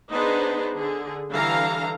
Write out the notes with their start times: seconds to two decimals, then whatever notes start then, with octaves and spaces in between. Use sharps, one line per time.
0.10 B3 D4 D#4 G#4 B4 C5
0.76 D3 G#4
1.32 D3 E3 G3 A4 F5 A#5